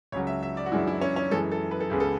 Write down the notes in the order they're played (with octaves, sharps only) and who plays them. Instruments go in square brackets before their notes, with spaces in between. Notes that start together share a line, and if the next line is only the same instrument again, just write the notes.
[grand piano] C#2 C#3 F#3 [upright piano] C#5
[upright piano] E5
E5
D5
F#4
[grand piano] F#2 E3 G#3 D4 [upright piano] E4
[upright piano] E4
C#4
C#4
[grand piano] F#2 E3 G#3 [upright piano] A4
[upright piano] A4
B4
A4
[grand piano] C#2 C#3 G#3 B3 [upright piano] G#4
[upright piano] A4